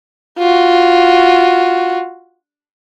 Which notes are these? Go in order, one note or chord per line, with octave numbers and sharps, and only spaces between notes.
F4 F#4